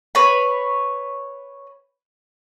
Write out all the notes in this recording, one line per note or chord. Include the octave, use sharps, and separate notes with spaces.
B4 C#5 B5